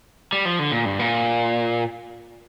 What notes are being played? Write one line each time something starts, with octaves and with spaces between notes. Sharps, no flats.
G3
F3
D3
A#2
G2
A#2